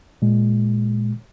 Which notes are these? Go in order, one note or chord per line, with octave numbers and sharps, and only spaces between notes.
A#2 G#3